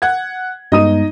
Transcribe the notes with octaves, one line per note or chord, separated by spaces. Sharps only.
F#5 G#6
G2 G#3 B3 D#4 D#5 D#6 D#7